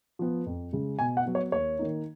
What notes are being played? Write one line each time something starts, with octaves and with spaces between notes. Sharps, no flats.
F3 B3
F2
C#3 G#3
B2 G#5
F#5
F#3 B3
C#5
D#2 C#5
D#3 A#3 D#4